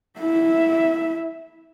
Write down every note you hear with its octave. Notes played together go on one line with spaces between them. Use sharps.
E4 E5